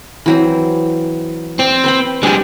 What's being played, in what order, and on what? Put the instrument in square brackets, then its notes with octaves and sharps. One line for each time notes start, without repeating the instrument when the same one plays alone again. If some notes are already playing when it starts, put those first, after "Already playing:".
[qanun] E3 F#3 C4
[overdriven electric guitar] C4 [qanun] D5
[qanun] B4 G5 B5
[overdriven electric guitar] G3 G#4 [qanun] D4 G4